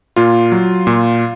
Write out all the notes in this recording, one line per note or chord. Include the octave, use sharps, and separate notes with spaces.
A#2 F4
F#3
A#2